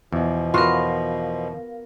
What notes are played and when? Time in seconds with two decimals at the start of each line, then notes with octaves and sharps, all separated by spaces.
0.12 E2 B2 F3
0.54 B3 F4 F#4 A#4 F5